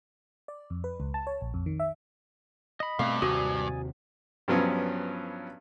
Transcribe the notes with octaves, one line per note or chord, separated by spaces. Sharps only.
D5
F2
B4
C#2
A5
C#5
A#1
F2
D#3
E5
D#5 B5
G2 B2 A3 C4 F5
D#2 C3 F#4 D5 G#5 D#6
G2 F3 F#3 B3 C#4